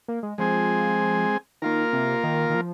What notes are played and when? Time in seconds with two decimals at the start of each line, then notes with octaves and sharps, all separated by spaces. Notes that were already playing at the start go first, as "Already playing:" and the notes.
0.08 A#3
0.23 G#3
0.38 F3 G#3 C4 G#4
1.62 D#3 A#3 F4 A#4
1.93 C3
2.24 D#3
2.50 D#3
2.55 F3